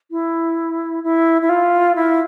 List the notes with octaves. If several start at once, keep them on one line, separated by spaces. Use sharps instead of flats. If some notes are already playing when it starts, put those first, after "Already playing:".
E4
E4
E4
F4
E4